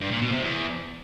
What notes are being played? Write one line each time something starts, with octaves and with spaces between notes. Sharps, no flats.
G2
A#2
B2
C3
E2